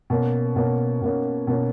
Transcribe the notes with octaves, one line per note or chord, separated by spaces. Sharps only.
B2 A#3 C#4
B2 A#3 C#4
B2 A#3 C#4
B2 A#3 C#4